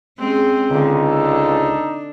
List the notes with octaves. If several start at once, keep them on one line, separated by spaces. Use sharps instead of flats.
G#3 C4 C#4 G#4
C#2 D3 D#4
D4 A4